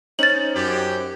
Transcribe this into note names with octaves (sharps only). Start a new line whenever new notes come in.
C#4 D#4 C5 A6 F#7
F#2 G4